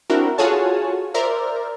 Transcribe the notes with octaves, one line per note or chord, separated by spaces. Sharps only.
C4 D4 E4 F#4 A#4
F4 F#4 G#4 A4 C#5 A5
A#4 C5 D5 E5